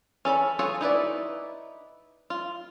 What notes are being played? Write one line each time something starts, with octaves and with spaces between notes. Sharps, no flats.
C#4 A4 A#5 B5
F4 F#4 G#4 A4 C#5
D#4 E4 B4 D5
F4